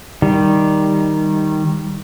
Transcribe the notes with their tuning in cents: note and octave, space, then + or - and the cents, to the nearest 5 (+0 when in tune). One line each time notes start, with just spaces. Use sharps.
D#3 +0 G3 +0